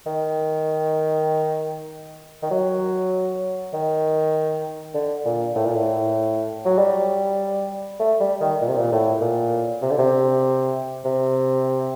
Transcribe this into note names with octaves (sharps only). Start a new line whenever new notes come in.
D#3
D#3
F#3
D#3
D3
A#2
A2
A#2
A2
F#3
G3
A3
G3
D#3
A#2
C3
A#2
A2
A#2
C3
D3
C3
C3